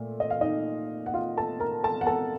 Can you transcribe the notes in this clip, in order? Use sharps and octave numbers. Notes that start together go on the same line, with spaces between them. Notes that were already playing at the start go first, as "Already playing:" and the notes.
Already playing: A#2 A3
D#5
F5
D#4 D#5
F#5
F4 F5
A4 A5
A#4 A#5
A4 A5
F#5
A4 A5